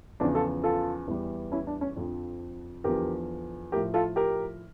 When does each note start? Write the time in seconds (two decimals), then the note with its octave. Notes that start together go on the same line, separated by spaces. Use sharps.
0.20 E2 C#3 F3 D4
0.35 F4 A4
0.64 F4 A4
1.08 E2 E3 G3
1.52 C#4 E4
1.67 D4
1.81 C#4
1.97 F2 D3 F3
2.84 E2 D3 F3 G4 A#4
3.72 A2 G4 A#4
3.77 F3
3.94 F4 A4
4.16 G4 A#4